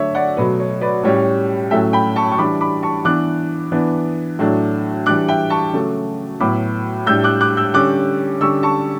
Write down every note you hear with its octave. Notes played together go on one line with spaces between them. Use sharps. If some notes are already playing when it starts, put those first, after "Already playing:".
Already playing: D3 F#3 A3 D4 C#5 E5
D5 F#5
B2 F#3 A3 B4
C#5
B4 D5
A2 G3 C#4 C#5
A2 F#3 A3 C#4 E5 G5
G5 B5
A5 C#6
C#6
E3 G3 D4 B5 D6
B5 D6
A5 C#6
E3 B3 D4 D6 F#6
E3 B3 D4
A2 F#3 A3 D4
E3 G3 D4 D6 F#6
E5 G5
A5 C#6
C#3 F#3 A3
A2 F#3 B3 B5 D6
A2 G3 D4 E6 G6
D6 F#6
D6 F#6
E6 G6
D3 G3 C#4 D6 F#6
D3 G3 C#4 C#6 E6
A5 C#6